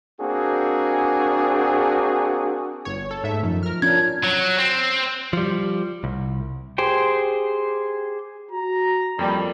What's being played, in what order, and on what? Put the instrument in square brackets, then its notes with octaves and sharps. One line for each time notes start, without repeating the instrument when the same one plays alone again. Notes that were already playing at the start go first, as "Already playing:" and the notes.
[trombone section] A#3 C4 D4 F#4 G#4
[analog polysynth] G1 C#5
A4
G#2 A3 E5
[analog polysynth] F#2 [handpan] F3 D#4
[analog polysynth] A#4 F6
[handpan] C#4 D4 F4 [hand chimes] G#6
[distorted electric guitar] F#3
C4
[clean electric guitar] F3 G3
C2
[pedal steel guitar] G4 G#4 C5 G5
[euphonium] F#4 [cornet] A#5
[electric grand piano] F2 [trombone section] G3 [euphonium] A#3